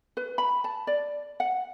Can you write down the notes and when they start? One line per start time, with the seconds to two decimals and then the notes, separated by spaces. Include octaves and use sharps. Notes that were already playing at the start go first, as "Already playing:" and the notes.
0.17 B4
0.38 B5
0.64 A5
0.87 D5
1.40 F#5